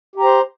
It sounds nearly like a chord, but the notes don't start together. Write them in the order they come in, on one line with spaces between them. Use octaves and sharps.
G4 A#5 C5